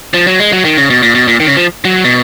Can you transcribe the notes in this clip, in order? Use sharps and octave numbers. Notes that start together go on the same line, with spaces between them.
F3
F#3
G#3
F#3
D#3
C#3
B2
A#2
B2
A#2
D#3
C#3
F3
F#3
B2